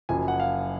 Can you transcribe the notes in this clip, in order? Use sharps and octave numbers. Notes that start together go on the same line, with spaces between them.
F#1 F#2 F3 G#5
F#5
F5